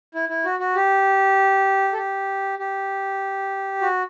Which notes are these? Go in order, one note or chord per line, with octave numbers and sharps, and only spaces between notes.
E4
E4
F#4
F#4
G4
A4
G4
G4
F#4